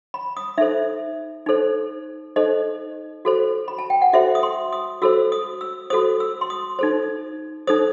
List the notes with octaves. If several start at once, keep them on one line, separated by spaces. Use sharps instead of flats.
B5
D#6
D#4 A4 C5 E5
D#4 A4 C5
D#4 A4 C5 D#5
F#4 A4 C5
B5
A5
G5
F#5
F#4 A4 C5 E5
D#6
C6
D#6
F#4 A4 C5 E6
D#6
E6
F#4 A4 C5 D#6
E6
C6
D#6
D#4 A4 C5
D#4 A4 C5 D#6